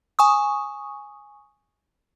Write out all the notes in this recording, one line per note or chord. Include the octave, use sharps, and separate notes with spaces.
G#5 C#6 D#6